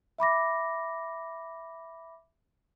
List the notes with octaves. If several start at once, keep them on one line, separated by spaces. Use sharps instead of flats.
E5 B5 D6 A#6